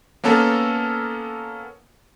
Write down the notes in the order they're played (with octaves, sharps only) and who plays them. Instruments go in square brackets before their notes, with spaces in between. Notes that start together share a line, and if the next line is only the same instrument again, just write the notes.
[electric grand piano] A#3 B3 C#4 A4 A#4